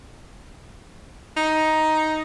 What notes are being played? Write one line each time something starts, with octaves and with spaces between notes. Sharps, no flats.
D#4